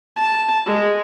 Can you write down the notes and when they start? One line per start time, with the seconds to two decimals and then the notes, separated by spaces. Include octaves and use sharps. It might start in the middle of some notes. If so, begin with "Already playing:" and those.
0.16 A5
0.66 G#3